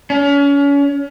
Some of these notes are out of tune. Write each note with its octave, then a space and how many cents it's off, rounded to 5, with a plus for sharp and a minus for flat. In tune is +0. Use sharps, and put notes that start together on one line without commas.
C#4 +35